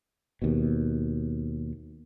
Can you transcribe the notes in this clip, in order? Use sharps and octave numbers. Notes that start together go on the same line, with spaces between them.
D#2 B2